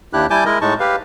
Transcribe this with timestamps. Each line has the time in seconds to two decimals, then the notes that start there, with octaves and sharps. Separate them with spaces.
0.13 D#2 D4 E4 G4 F#6
0.30 G3 E4 G#5 A5 D6 G6
0.45 G#3 E4 A#4 D#5
0.61 A2 G#3 D#4 A5 C#6
0.80 G4 B4 F5